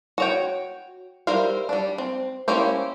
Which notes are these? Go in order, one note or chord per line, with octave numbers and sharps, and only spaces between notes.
F#4 C#5 G5
G3 A#4 C5 E5 F5
G3 D4
C4
A#3 C#4 E4 G4 C5